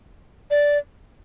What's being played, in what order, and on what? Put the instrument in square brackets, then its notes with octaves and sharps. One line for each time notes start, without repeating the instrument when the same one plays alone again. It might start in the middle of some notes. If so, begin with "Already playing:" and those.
[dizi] D5